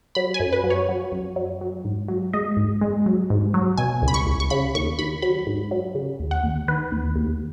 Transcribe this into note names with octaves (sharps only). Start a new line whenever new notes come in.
F#3 B5
G#5
F#2
B4
F#3
C#5
F#3
F#2
F#3
F#3
G#2
F#3
G#3 D#5
G#2
G#3
F#3
G#2
F#3
B2 G#5
C#2
B5
C#6
C#2
C#6
C#3 B5
D#2 C#6
D#2 B5
F#3 B5
G#2
F#3
C#3
D#2
F#5
D#2
D#3 B4
D#2
D#2